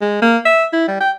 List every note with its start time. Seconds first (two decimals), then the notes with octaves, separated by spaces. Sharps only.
0.02 G#3
0.22 A#3
0.45 E5
0.73 E4
0.88 G3
1.01 G5